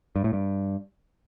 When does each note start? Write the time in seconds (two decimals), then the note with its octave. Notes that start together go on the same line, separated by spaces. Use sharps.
0.16 G2
0.24 A2
0.33 G2